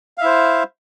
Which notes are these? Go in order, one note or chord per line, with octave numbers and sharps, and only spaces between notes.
E4 C5 E5 F5